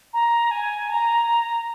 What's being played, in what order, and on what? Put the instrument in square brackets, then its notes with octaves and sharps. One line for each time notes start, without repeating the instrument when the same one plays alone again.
[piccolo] A#5
G#5
A#5